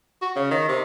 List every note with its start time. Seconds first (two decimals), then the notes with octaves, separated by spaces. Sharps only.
0.22 F#4
0.36 C#3
0.51 D#3
0.69 C3